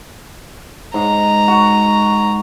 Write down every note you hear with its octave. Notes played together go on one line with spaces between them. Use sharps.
G#2 A#5
F#4